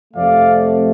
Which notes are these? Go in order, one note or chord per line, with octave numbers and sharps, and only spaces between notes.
F2 C3 F3 A3 D5 F5